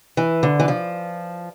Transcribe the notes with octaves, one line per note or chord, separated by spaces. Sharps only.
E3
D3
E3
F3